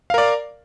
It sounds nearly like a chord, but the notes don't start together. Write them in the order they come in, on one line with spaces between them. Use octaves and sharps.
F5 A#4 D5